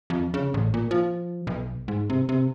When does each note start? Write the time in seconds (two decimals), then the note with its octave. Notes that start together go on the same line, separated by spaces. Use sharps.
0.10 F2
0.34 C#3
0.54 A1
0.74 A#2
0.91 F3
1.47 B1
1.88 G#2
2.10 C3
2.29 C3